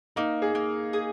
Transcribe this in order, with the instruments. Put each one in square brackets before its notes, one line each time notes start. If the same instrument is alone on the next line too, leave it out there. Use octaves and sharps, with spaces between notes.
[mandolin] A#3 [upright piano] D#4
[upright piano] G#4
[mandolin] A#3
G#4